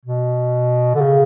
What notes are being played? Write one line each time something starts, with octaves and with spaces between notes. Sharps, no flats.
B2
D3
C#3